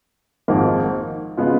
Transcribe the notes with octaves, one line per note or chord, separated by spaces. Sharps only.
G#1 G#2 F3 A#3
C#3 G#3 B3 F4